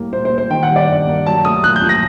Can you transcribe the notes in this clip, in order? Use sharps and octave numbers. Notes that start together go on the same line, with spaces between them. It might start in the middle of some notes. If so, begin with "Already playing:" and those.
Already playing: A2 G3 A#3
A#2 C5
C5
A#2
C5
D#3 G5
F#5
G3
D5
G2
A#3
F#3 A5
A3 D#6
A#2 F#6
G6
A#2
A#6